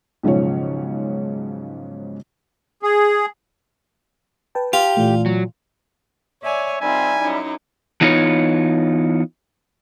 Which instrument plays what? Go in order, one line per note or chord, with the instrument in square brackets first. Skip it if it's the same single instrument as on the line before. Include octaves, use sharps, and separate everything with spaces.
[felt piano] B1 G#2 C#3 F3 C#5
[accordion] G#4
[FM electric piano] B4 G5 A5
[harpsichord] F4 [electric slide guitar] G4
[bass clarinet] A#2 [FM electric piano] E3 A3
[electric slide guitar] F#3
[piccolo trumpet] C#5 [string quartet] D5 E5 G#5
[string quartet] D#3 C4 F4 [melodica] G3 E5 [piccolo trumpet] G#5
[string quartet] F#2 D#4 E4
[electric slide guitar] E3 B3 D#4 F4 B4 C#5